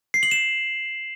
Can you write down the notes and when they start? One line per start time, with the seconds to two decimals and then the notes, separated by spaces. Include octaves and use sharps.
0.14 C7
0.23 F#7
0.31 E7